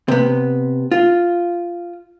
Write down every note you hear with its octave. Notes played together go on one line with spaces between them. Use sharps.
C3 B3
F4